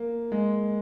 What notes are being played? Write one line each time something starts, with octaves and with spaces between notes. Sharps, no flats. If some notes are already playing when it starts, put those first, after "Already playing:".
Already playing: A#3
G#3